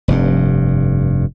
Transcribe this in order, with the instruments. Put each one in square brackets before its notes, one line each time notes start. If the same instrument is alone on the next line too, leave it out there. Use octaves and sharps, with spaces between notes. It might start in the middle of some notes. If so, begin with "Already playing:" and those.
[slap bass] F1 G2